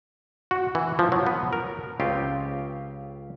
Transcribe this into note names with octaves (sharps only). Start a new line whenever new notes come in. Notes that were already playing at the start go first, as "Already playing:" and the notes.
F#4
E3
F3
F#3
B3
A#4
C#2 C#3 C4 F4 G4 F5